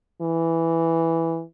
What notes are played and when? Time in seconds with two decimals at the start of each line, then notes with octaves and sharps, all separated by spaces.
0.21 E3